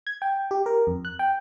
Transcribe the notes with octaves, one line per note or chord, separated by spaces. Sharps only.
G#6
G5
G4
A#4
F2
F#6
G5